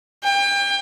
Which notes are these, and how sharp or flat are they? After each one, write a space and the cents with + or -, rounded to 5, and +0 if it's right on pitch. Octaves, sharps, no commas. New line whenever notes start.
G5 +30